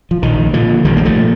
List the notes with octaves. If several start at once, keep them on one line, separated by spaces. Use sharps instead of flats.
F3
A#1 D#3
A#2 D3 F3
A#1 D#3 G3
A#3
F3 A3
A#2